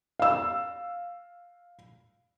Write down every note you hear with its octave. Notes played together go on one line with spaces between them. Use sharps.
F5 E6